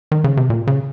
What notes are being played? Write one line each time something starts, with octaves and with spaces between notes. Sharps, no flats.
D#3
C#3
C3
A#2
C#3